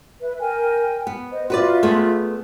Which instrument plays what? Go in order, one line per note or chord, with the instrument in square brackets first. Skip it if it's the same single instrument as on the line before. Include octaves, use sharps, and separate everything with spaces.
[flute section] B4 E5
A#4 G5 G#5
[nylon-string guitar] B3
[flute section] C5 D#5
[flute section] F4 E5 C6 [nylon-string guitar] F#4 B4 D5
[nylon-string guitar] A3 B3 G#4